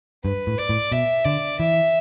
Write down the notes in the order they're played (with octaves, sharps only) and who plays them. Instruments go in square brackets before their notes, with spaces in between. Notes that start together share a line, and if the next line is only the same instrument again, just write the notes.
[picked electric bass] G2 [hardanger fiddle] B4
[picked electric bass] A2
[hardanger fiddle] D5
[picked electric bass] A2
[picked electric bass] B2 [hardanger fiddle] E5
[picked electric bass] D3 [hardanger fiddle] D5
[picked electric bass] E3 [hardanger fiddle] E5